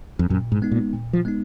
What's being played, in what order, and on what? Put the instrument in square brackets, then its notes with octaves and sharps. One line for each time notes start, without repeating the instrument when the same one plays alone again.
[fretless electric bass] F2
[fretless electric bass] F#2 [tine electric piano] A#2
[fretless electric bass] G#2
[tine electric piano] G#3 B3 D#4
[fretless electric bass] A#2
[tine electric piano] A#2
[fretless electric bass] F3
[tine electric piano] G#3 B3 D#4